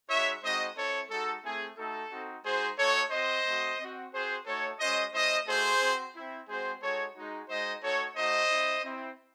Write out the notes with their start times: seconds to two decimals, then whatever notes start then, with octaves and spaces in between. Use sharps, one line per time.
0.08 G#3 D#4 F#4 C#5 E5
0.43 G#3 C4 D#4 F#4 C5 D#5
0.76 C4 E4 A4 C#5
1.09 G#3 D#4 F#4 A4
1.44 A3 C4 E4 G#4
1.77 A3 D#4 F#4 A4
2.11 C4 D#4 F#4
2.44 G#3 D#4 F#4 G#4 C5
2.78 A3 D#4 F#4 A4 C#5
3.11 C4 F#4 C5 D#5
3.45 A3 C4 F#4
3.80 C4 F#4
4.13 C4 F#4 G#4 C5
4.46 A3 D#4 F#4 A4 C#5
4.80 G#3 C#4 F#4 C5 D#5
5.13 A3 C#4 E4 C5 D#5
5.47 A3 D#4 F#4 G#4 C5
5.81 C4 F#4
6.14 C4 E4
6.48 G#3 C4 F#4 G#4 C5
6.81 G#3 D#4 F#4 A4 C#5
7.16 G#3 D#4 F#4
7.49 G#3 D#4 F#4 C5 D#5
7.82 A3 D#4 F#4 A4 C#5
8.16 A3 D#4 F#4 C5 D#5
8.50 C4 E4
8.83 C4 E4